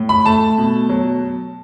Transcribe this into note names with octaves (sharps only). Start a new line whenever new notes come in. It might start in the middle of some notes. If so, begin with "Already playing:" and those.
Already playing: A2
B5
A3 A5
B2
F#3